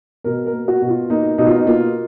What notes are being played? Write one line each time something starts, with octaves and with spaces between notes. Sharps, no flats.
B2 A#4
A#4
A#3
F#4
B2
F4
A#3 D#4
B2 D#4
F4
D#4
A#3 F4